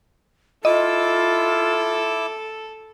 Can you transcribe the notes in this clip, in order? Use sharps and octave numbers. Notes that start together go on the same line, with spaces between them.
E4 F4 A4 D#5 D6 E6